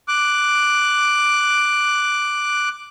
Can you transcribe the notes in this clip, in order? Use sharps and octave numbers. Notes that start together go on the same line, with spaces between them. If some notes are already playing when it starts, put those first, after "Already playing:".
D6 F#6